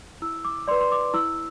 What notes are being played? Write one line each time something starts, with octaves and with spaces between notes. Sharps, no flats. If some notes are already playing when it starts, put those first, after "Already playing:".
E4 E6
D6
B4 D5 C6
C6
D6
E4 E6